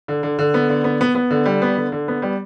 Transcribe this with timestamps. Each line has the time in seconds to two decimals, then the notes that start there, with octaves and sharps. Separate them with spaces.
0.08 D3
0.23 D3
0.39 D3
0.54 B3
0.69 D3
0.84 B3
1.01 B3
1.15 B3
1.31 D3
1.46 G3
1.62 B3
1.77 D3
1.92 D3
2.08 B3
2.22 G3